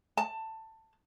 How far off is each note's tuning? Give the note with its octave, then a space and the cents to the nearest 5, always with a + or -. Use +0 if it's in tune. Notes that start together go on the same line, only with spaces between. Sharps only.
A5 +15